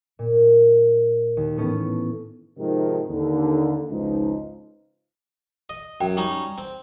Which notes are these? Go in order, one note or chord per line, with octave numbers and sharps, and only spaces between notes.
A#2
D#2
A2 E3 A3 B3 C#4
G#2 C3 D#3 F3 G#3
D#2 D3
G#1 C#2 F3 D#4
D#5
F#2 G5
G3 C#4 D#4
C4